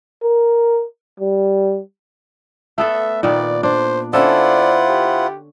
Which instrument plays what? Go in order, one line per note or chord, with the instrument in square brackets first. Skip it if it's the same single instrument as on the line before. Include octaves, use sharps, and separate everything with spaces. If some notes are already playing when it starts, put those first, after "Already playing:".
[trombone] A#4
G3
[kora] A3 B3 A4 [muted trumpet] E5
[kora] A#2 D#3 B3 [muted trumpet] D5
[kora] D4 [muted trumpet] C5
[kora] D3 C#4 A4 [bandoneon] E4 F4 F#5 [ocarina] C5 [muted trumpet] D5
[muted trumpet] G4